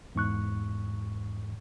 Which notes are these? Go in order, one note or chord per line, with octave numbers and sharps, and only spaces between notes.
E2 G#2 C#6 F#6